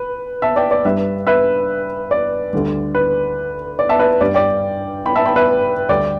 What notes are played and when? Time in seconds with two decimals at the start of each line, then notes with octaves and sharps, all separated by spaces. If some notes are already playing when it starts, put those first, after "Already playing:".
Already playing: B4
0.42 E5 A5
0.56 D5 G5
0.71 D5
0.85 G2 G3 B4 E5
1.27 B4 E5
2.11 D5
2.53 D2 D3 G3
2.95 B4
3.79 D5
3.89 E5 A5
3.99 B4 E5
4.21 G2 G3 D5
4.34 D5 G5
5.06 G5 B5
5.16 E5 A5
5.26 G5 B5
5.36 B4 E5
5.89 D2 D3 G3 D5 G5